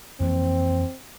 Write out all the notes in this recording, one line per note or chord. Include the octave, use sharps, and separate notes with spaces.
F2 E3 A#3 C4